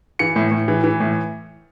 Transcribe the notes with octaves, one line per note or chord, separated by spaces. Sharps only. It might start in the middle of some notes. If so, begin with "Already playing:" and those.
E3 C#7
A2
A2
E3
E3
A2